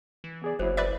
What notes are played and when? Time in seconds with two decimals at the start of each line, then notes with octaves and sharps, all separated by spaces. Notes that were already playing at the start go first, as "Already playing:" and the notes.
0.24 E3
0.42 B3 G#4 D5
0.59 F#1 F#3 E4 C5
0.77 B4 D5 E5